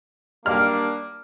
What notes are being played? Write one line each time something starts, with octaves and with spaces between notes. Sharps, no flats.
G3 A#3 D4 F6